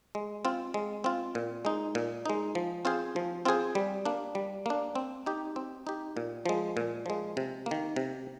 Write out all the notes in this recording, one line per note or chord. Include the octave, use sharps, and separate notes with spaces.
G#3
C4 F4
G#3
C4 F4
A#2
G#3 D#4
A#2
G#3 D#4
F3
C4 F4 G#4 C5
F3
C4 F4 G#4 C5
G3
A#3 D4
G3
A#3 D4
C4
D#4 G4
C4
D#4 G4
A#2
F3 G#3
A#2
F3 G#3
C3
A#3
D#3
C3